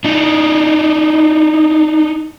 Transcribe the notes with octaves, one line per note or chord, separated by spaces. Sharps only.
D4 D#4